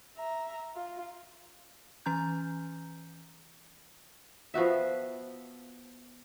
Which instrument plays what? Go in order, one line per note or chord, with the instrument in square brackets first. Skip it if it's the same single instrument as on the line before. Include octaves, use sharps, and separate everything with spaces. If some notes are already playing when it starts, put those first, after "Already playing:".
[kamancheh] E5 A#5
F4
[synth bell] E3 C#4 A#5 G6
[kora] F3 B3 F#4 E5